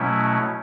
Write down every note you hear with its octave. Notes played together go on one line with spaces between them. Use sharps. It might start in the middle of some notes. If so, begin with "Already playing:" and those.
Already playing: B2 F#3 A3 C#4 E4